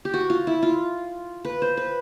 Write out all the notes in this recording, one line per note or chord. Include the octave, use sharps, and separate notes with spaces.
G4
F#4
F4
E4
F4
B4
C5
B4